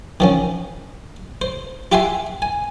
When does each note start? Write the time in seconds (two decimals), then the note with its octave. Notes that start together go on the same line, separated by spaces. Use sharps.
0.20 D#3 F3 C#4
1.42 C5
1.92 F4 G4 E5 F#5 G#5 C6
2.42 G#5